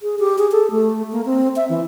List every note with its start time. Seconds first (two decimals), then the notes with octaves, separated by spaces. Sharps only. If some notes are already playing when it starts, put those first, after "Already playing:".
0.01 G#4
0.19 G4
0.38 G#4
0.52 A4
0.71 A3
1.12 A#3
1.26 C4
1.56 E5
1.69 E3